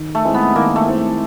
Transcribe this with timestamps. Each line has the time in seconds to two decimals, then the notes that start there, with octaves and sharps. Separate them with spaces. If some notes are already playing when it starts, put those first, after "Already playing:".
Already playing: D#3
0.15 A3
0.25 G#3 C4 E4
0.34 B3
0.56 D#3 A#3
0.76 A3
0.86 G#3 C4 E4